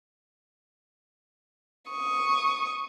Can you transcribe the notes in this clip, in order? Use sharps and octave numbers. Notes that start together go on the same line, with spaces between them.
C#6 D#6